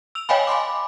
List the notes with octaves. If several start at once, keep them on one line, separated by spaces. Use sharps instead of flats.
E6 F7
C#5 D#5 F5 G5 G#5 B5
G#5 B5 C6 D6